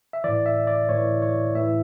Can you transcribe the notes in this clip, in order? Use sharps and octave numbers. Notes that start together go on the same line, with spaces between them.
E5
A2 E3 D5
E5
D5
A2 E3 C#5
C#5
A2 E3 E5